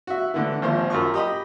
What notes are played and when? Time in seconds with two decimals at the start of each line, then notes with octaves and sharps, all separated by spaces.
0.07 F#4 E5
0.34 A2 D3 E3
0.62 G#1 D#2 F3 C5
0.90 F#2 F4 C#6
1.14 G4 D#5 B5